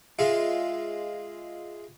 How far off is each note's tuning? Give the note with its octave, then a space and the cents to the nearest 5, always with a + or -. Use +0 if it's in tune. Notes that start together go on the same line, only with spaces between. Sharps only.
G#3 +0 F4 +0 E5 +0